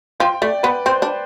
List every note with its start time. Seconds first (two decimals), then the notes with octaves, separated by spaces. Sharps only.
0.20 F3 G5
0.42 A3 D5
0.63 B3 B4
0.86 C4 C5
1.02 D4